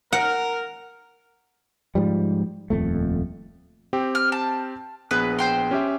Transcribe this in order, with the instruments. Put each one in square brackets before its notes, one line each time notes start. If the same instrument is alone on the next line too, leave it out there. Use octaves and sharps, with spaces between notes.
[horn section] A#4 [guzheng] F#5
[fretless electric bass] G#2 F3 G3
D#1 F2 A3
[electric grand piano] C4 G4 G5
[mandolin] F6
A5
[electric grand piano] A#1 B3 G#4 [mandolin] B4
[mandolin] C5 G5 C6
[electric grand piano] C#4 G4 E5